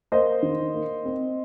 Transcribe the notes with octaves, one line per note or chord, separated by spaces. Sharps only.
A#3 C5 D#5
D#3
A#3
C4